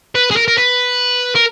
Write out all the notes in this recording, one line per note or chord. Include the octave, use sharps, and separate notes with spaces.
B4
G#4
A#4
A#4
B4
A#4